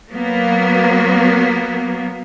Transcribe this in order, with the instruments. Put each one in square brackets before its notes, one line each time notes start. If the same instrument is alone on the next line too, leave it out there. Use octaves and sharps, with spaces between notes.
[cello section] F#3 A#3 B3